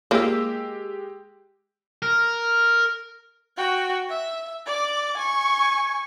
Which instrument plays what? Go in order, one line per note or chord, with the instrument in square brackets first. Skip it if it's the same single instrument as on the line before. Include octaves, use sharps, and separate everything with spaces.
[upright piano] G#3 G4 E6 [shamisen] A#3 F4
[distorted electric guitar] A#4
[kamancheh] F#4 G5
E5
D5 D6
G#5 C#6